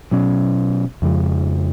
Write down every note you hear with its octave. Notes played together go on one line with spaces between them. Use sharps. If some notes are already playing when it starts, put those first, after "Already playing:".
B2 F#3 C#4
F2 C#3 F3 G#3